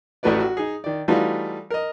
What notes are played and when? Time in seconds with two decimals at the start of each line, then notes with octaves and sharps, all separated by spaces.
0.23 A1 A2 A3 F#4 B4 D5
0.40 F#4
0.57 D#4 G#4
0.84 D#3 D5
1.08 E3 G3 A3 D#4 F4 F#4
1.70 A#4 D#5